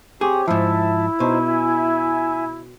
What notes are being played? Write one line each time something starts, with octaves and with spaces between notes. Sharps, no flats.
C4 G4 G#4 C#5
G#2 F3 E4 E5 A5
B2 D#4 C5
E5 G#5